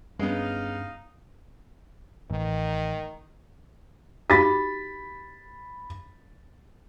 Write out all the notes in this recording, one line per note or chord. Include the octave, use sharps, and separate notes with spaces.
G2 G#3 B3 C#4 D#4 F5
A1 D#3
D#4 F#4 G4 B5 A6 B6